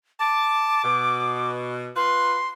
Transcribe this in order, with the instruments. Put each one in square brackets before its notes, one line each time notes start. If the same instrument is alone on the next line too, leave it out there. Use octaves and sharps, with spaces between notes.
[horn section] A5 [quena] D6
[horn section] B2
[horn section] F4 B4 [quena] C6